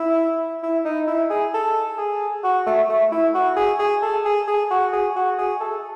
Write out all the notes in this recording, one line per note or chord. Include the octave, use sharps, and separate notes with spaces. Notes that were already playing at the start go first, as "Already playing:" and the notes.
Already playing: E4
E4
D#4
E4
G#4
A4
G#4
F#4
A3
A3
E4
F#4
G#4
G#4
A4
G#4
G#4
F#4
G#4
F#4
G#4
A4